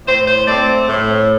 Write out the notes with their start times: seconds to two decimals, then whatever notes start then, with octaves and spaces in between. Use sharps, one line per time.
0.06 A2 C5
0.26 C5
0.47 A3 C4 D5
0.88 A2